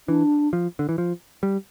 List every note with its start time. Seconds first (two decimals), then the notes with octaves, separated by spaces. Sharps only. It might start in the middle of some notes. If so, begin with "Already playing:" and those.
0.08 E3 D4
0.53 F3
0.79 D3
0.89 E3
0.98 F3
1.43 G3